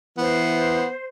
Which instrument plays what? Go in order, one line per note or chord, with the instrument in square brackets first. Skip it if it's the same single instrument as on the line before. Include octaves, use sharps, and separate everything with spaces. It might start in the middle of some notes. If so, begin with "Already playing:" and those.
[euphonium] E3 [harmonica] B3 [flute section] C5